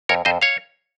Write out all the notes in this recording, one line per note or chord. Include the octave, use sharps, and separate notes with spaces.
F2 A#4 C#5
F2 C5 D#5
C#5 F5